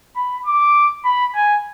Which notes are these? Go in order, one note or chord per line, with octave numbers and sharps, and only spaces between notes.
B5
D6
B5
G#5